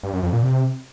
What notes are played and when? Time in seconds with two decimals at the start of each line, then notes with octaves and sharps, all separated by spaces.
0.03 G2
0.13 F#2
0.23 F2
0.33 A#2
0.43 C3